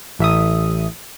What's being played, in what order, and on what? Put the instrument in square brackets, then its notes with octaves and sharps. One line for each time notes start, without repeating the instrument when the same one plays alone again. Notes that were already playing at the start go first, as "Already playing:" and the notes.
[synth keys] A1 E5 D#6